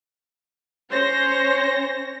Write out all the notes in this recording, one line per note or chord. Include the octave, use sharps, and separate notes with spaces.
C#4 C5 C#5 A#6